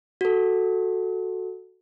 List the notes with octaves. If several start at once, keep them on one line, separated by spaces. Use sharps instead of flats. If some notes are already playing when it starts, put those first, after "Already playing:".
F#4 A4